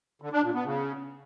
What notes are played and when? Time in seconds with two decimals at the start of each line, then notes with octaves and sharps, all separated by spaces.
0.22 D3
0.32 D4
0.43 A#2
0.54 B3
0.65 C#3